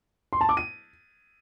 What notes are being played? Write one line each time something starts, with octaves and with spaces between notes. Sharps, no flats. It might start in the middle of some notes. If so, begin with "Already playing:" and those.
C6
A5
D6
D#7